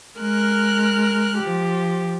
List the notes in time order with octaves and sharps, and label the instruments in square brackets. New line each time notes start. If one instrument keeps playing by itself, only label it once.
[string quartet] G#3 A#4 F6 F#6
F3 G4